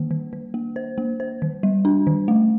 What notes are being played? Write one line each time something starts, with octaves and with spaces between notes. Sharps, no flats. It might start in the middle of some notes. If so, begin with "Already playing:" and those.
Already playing: D#3 A#3
D#3
D#3
A#3
C5
A#3
C5
D#3
G3
D4
D#3
A3